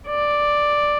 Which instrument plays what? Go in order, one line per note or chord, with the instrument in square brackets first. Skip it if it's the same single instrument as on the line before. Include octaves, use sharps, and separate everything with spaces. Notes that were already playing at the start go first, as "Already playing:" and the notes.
[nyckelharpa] D5